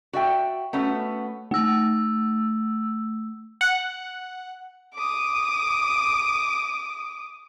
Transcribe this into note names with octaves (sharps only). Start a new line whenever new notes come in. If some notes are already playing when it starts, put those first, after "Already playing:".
F#4 D5 E5 G5
A3 B3 C#4 F#4
A3 E6
F#5
D6 D#6